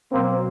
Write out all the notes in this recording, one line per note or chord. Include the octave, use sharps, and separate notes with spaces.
B2 F#3 A#3 C4